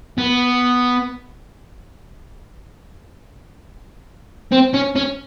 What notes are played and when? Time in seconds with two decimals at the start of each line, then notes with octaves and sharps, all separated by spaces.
0.18 B3
4.52 C4
4.73 C#4
4.95 C#4